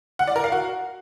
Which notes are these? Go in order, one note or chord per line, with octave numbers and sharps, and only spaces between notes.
F#5
D5
A#4
F5
F#4